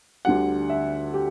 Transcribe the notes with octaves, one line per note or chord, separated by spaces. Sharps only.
D2 D3 G3 F#5
E5
G4